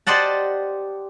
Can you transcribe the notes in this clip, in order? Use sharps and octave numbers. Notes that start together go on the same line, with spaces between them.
G4 C5 D5 D#5 F#5 A5